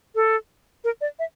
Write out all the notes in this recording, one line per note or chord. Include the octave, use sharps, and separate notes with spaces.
A4
A#4
D5
E5